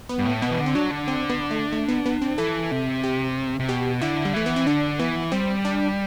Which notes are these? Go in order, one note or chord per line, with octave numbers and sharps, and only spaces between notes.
B3
G2
A2
B2 B3
E3
D3
C4
F#3 D4
D3
C4
B3
A3
A3
B3
B3
C4
E3 A4
C3
G4
C3
B2 G4
D3 E4
G3
E3 A3
B3
C4
D3 D4
E3 B3
G3 C4
D4